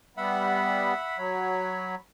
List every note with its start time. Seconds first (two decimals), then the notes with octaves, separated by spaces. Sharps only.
0.17 G3 B3 E5 F#5 B5
1.18 F#3 C#5 B5